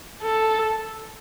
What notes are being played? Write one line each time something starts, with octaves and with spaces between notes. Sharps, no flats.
A4